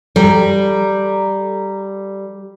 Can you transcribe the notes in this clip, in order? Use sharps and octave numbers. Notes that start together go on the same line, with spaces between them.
G3 A4 A#5